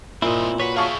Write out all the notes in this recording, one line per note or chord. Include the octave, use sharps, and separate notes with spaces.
A#2 C4 E4 D#5
F#4 B4 C#5 B6
E4 G#4 F5 A5 C#6